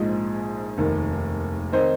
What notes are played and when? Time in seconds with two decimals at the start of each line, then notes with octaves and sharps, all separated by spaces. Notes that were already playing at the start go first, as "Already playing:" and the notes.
Already playing: A#1 G#2 F3 G#3 G#4
0.78 F1 D#2 D#3
1.72 D#3 C4 D#4 C5